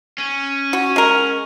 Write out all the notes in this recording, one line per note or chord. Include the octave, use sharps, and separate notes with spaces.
C#4
F#4
G#3 A#4